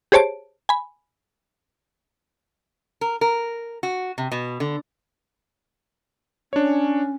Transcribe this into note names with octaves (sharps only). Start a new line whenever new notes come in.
G4 G#4 C5 C#5 A5 D7
G#5 B5
A#4
A#4
F#4
C3
B2
D3
C#4 D4 C#5